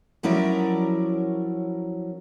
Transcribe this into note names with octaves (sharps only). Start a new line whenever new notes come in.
F3 F#3 C#4 E4 A#4 D5